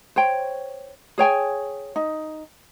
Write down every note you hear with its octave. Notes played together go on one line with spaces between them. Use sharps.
C5 C#5 G5
G#4 C#5 G5 G#5
D#4